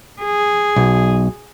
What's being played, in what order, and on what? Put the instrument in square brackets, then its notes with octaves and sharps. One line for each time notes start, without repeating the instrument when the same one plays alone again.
[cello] G#4
[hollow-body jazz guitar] B1